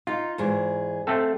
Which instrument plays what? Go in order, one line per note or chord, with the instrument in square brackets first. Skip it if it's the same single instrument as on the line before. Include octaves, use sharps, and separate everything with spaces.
[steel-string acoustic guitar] D#4 [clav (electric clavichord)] F4
[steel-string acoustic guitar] E2 G#2 G#4
[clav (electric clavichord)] A3 C4 A4